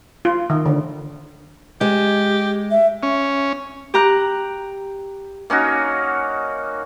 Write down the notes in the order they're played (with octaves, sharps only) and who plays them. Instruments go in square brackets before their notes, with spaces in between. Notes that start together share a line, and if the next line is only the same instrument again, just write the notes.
[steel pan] F4
D#3
D3
[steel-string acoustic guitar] G#3 [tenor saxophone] G4
[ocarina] E5
[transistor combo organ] C#4
[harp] G4 A#5 F#6
[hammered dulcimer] A#3 C#4 D#4 F#4